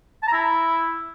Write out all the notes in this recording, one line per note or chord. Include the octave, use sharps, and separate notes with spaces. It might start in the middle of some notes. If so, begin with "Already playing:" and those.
A5
A#5
E4